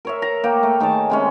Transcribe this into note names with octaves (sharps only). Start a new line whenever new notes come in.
A#4 C#5 E5
A#5
A#3 G5
A3
D#3 G#4 C#5 A5
C3 G#3 C#4